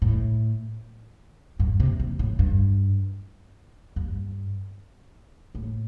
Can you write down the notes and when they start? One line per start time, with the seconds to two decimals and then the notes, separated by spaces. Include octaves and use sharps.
0.02 A2
1.60 G2
1.80 C3
2.00 C3
2.19 A2
2.39 G2
3.96 G2
5.55 A2